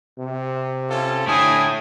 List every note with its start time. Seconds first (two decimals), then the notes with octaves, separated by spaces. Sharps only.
0.19 C3
0.89 C#4 F4 A4
1.27 D3 A3 E4 C#5 G5 G#5 D#6